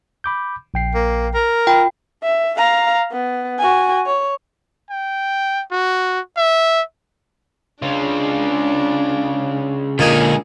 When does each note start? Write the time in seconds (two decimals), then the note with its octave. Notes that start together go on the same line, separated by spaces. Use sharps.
0.24 B5 D6 G6
0.74 A#1 G5 C7
0.95 A#3
1.34 A#4
1.67 F4 G5 B5
2.23 E5
2.57 F5 A#5
3.12 B3
3.59 F#4 G#5
4.06 C#5
4.90 G5
5.72 F#4
6.37 E5
7.82 C#3 D4 F4
9.99 C#2 A#2 D3 A#3 D#4 G#4 G#5